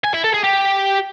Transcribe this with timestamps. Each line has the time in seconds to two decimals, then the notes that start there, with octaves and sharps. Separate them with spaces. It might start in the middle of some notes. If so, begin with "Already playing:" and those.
0.04 G#5
0.14 E4
0.24 A4
0.34 G#4
0.44 G4